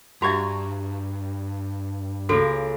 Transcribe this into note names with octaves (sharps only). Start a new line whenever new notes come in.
G2 F#4 G4 E5 A#5 C#6 G#6
C#2 A#3 F#4 A4